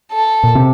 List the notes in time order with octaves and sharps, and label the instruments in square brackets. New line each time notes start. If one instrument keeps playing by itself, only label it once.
[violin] A4
[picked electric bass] A#2
C3